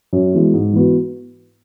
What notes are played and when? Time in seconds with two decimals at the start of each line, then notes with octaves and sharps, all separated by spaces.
0.13 F#2
0.33 E3 G#3 B3 F#4
0.54 G#2
0.73 E3 B3 F#4